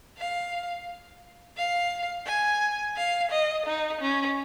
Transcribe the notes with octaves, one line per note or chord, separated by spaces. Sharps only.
F5
F5
G#5
F5
D#5
D#4
C#4